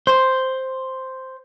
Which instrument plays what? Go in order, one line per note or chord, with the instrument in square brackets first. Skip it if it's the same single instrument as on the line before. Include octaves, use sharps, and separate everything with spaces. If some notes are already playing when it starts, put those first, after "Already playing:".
[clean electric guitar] C5